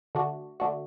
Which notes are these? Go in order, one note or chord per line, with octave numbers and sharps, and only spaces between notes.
D3 A3 D4 F#4
D3 A3 D4 F#4